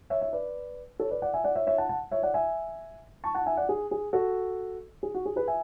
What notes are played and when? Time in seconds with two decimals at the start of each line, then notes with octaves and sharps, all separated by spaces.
0.10 C#5 E5
0.22 E5
0.33 B4 D5
1.00 A4 C#5
1.11 B4 D5
1.22 D5 F#5
1.34 E5 G#5
1.44 D5 F#5
1.56 C#5 E5
1.67 C#5 E5
1.78 F#5 A5
1.89 F#5 A5
2.11 C#5 E5
2.23 D5 F#5
2.34 E5 G#5
3.24 A5 C#6
3.35 F#5 A5
3.46 E5 G#5
3.57 D5 F#5
3.69 G#4
3.91 G#4
4.13 F#4 A4
5.03 G#4
5.14 F#4
5.26 G#4
5.36 G#4 B4
5.48 E5 G#5